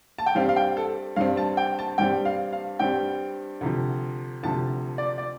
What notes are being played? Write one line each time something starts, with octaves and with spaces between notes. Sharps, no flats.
A5
G5
G2 G3 C4 F5
F5
G5
A4
G2 G3 C4 F5
A5
G5
A5
G2 G3 C4 G5
F5
F5
G2 G3 C4 G5
D2 C3 F3
D2 C3 F3 A5
D5
D5